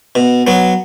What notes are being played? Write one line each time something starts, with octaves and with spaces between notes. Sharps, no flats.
B2
F#3 B3